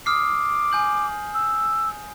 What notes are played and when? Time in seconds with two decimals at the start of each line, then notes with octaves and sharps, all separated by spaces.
0.06 D6 D#6 F6 C7
0.72 G#5 G6 F#7
1.34 E6